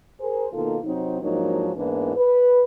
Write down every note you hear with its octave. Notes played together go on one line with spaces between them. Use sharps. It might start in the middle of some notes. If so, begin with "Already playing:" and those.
G#4 A#4 C5
B2 D#3 A#3 D#4 F4 A4
C3 F#3 C4 D#4
G#2 F3 F#3 A#3 D4 D#4
E2 G#2 E3 A#3 D4 E4
B4